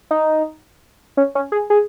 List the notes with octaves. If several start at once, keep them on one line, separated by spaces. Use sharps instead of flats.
D#4
C#4
C#4
G#4
G#4